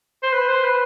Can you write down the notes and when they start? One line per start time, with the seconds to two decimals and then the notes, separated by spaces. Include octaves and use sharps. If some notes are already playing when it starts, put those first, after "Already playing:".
0.23 C5
0.33 B4
0.49 C5
0.64 B4